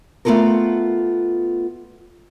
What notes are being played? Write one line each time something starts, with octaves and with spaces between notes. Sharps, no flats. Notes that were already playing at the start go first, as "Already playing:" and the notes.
A3 B3 C#4 F4 A4 A#4